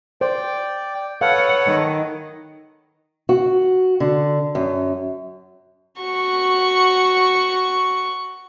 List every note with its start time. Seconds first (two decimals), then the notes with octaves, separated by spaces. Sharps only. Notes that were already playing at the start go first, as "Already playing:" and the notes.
0.21 C5 D5 G5
1.21 A4 B4 C#5 F5 F#5
1.66 D#3
3.29 F#4
4.00 D3
4.55 F#2
6.01 F#4 C#6